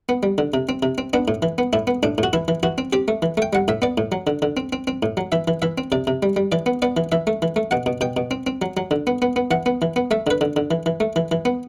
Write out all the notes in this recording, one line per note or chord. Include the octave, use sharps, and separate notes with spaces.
B3
G3
D3
C3
C4
C3
C4
B3 D4
A2
E3
B3
A2 E4
B3
A2 D4
A2
F#4
E3 E4
E3
E3 F#4
C4
C4 G4
A3
E3
A3 G5
G3 F#5
A2 E5
B3 D5
A2
F#3
D3
D3
C4
C4
C4
A2
F#3
E3 E5
E3
E3 E5
C4
C3 D5
C3
G3
G3
E3 D5
B3
B3 D5
E3
E3 E5
A3
E3
A3
B2 F#5
B2
B2 G5
B2
C4
C4
F#3
F#3
D3
B3
B3
B3
E3 F#5
B3
E3
B3
A3 E5
D3 B4
D3
D3
E3
E3
A3
E3
E3
B3